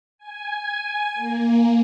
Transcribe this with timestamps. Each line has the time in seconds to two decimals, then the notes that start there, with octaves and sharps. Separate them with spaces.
0.18 G#5
1.15 A#3